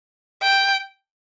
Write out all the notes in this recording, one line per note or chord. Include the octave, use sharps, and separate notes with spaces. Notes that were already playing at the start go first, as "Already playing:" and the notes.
G5